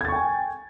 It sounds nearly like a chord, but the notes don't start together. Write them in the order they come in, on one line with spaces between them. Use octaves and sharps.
G#6 A6 C#6 G5 G#5